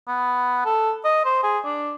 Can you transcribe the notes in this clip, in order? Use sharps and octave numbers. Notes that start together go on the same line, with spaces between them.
B3
A4
D#5
C5
G#4
D4